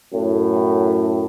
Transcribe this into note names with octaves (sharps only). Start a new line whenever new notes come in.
F#2 A2